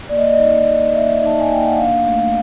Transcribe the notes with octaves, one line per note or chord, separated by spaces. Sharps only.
A#3 D5
D#5
D5
D#5
D#4 D5
D#5
A#3
A#3 E5
D#4 A5
G#5
A#3 G5
F#5
D4 F5
A3